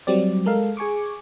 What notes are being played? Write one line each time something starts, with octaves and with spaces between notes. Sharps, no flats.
F#3 G3 C4 D5
G#3 A4 A#4 F5
G#4 G#5 C#6 D6